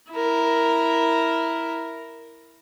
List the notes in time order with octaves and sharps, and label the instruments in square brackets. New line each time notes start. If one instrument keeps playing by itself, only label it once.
[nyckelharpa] E4 A#4